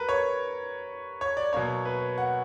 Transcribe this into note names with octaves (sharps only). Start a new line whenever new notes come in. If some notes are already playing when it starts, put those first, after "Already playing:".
Already playing: G3 A#4 B4
C#5
C#5
D5
B2 F#3 A#3 C#5
B4
F#5